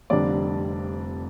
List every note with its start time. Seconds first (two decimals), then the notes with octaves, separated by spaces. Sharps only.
0.10 F1 F2 D3 G3 D4 D5